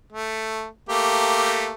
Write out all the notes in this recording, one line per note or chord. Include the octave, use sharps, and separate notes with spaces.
A3
A3 A#3 G4